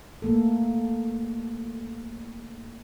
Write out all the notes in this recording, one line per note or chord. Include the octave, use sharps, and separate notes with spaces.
A3 A#3 A4